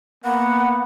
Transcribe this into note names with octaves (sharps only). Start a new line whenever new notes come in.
A#3 B3 F#5